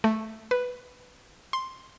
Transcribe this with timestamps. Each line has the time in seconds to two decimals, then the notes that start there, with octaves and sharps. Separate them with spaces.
0.04 A3
0.51 B4
1.53 C6